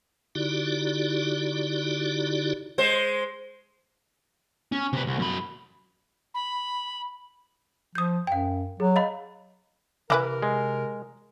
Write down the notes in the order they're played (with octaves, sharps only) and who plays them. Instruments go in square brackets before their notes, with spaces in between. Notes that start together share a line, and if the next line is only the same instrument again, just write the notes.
[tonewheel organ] D3 D#4 E4 F#4 G4 D5
[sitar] G#3 C5
[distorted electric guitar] C#4
C3 B4
C2
F#2 B5
[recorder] B5
[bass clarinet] F3 [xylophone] D#6 G6
[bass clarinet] F#2 [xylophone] F5 G5
[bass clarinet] F#3 [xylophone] G#4
[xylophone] D#5 F5 B5
[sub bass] C3 [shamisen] E3 E4 B4 [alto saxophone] A#4
[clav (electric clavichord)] G#3